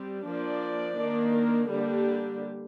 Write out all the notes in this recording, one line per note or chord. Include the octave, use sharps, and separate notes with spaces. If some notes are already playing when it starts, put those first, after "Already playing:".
Already playing: G3 C4
F3 A#3 D4 D5
D#3 A#3 D4
A#4
D3 G3 A#3 D4 G4